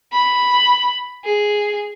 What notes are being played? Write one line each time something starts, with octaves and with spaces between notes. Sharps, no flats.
B5
G#4